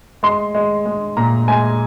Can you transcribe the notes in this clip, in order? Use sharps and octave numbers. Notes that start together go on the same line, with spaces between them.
G#3 C6
G#3
G#3
A#2 A#5
G#3 G#5